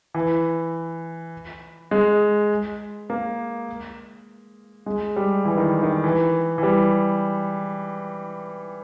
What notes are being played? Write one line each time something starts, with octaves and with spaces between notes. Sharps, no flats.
E3
G#3
A#3
G#3
G3
E3
D#3
D#3
E3
E3
G3